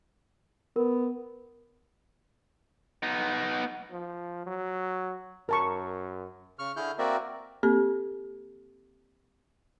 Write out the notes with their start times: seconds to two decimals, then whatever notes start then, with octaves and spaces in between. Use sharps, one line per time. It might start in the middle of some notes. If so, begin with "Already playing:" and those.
0.76 B3 A#4
3.03 B3 D#4
3.91 F3
4.46 F#3
5.49 F#2 A#4 A5 C#6
6.59 C#3 C#6 F6
6.76 D3 E4 G#4 F6 G6
6.99 A#3 C4 F#4 A#4 D5 E5
7.63 A#3 C4 G4 A4